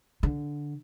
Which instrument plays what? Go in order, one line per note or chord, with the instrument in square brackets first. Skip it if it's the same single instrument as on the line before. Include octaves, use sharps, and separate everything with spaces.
[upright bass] D3